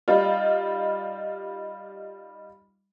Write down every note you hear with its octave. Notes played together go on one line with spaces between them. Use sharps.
G3 D#4 F4